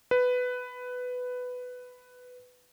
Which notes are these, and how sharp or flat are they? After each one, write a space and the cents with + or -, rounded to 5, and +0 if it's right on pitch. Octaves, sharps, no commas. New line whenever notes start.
B4 +10